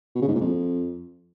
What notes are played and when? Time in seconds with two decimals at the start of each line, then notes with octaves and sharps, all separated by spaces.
0.15 B2
0.22 C#3
0.28 G#2
0.35 A#2
0.41 F2